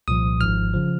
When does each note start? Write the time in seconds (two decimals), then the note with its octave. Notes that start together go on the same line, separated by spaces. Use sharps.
0.08 C2 A#2 F3 D#6
0.40 G#1 G#2 F3 F6
0.73 C#3 F3